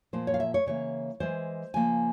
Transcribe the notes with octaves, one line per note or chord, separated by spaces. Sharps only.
A#2 F3 A#3 C5
C#5
F5
E5
C#5
C#3 E3 A#3 C#5
E3 G#3 C5
C#3 F3 A#3 G#5